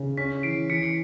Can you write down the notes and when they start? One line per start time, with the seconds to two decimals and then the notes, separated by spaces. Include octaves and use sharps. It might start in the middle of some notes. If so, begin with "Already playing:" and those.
Already playing: C#3
0.17 C#4 B6
0.43 E3 C7 D7
0.69 E3 B6 C#7